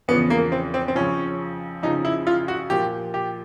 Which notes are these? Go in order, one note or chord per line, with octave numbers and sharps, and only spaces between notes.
E2 C#3 F3 B3
A#3
C4
C4
C4
F2 C#3 F3 C#4
F2 C#3 F3 D#4
E4
F4
F#4
A#2 F3 G4
G4